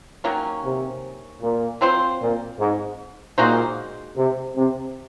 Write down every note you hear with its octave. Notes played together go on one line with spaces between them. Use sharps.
D#3 F#3 A#3 C#4
C3
A#2
F#3 C4 F4 C5
A#2
G#2
A#2 G#3 D#4 F#4 C5
C3
C3